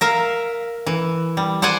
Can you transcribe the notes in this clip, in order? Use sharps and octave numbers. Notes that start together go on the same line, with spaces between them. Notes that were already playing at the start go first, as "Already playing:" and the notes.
A#4 E5 F5
E3
G3
C5 D5 F#5 G#5